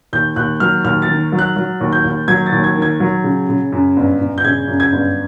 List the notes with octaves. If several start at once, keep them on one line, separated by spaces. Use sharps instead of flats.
D#2 G6
D#2 F#6
F#3 F6
D#2 F6
A6
D#3
F#3
F#6
F#3
D#2
G6
D#2
F#3 G#6
A6
D#2
G#6
D#3
G#6
F#3
C#3
C#3
F#2
G1
G1
G6
C#3 G#6
F#2
G#6
G1